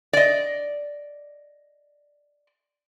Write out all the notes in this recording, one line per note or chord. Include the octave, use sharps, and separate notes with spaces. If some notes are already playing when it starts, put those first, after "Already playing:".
D5 D#5